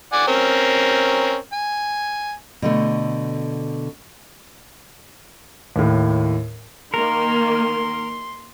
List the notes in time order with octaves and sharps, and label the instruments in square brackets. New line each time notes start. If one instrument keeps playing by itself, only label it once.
[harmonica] D5 F#5 G#5
C4 C#4 A#4
G#5
[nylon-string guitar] B2 D3 A3
[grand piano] D#2 A2
[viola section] D#3 A#3 [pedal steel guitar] A#4 [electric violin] C6